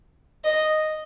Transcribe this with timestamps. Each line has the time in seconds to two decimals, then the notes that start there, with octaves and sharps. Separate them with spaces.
0.44 D#5